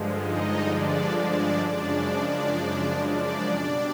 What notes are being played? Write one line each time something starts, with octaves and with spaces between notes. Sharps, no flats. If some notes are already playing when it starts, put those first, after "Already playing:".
Already playing: G2 D3 F3 G#3
D#4 D#5
D4 D5
D4 D5
F#2 C#3 F3 G#3 D4 D5
D4 D5
B2 G3